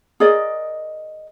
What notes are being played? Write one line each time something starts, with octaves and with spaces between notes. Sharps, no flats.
G#4 A#4 D5 D#5